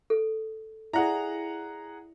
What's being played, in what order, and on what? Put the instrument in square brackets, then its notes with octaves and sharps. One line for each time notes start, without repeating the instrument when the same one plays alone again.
[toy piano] A4
[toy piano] E4 D5 E5 [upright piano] G#4 F#5 A#5